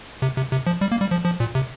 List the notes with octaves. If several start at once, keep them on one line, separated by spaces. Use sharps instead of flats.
C3
C3
C3
F3
G3
A#3
G3
F3
F3
A#2
C3